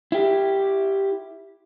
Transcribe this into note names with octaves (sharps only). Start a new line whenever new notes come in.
E4 G4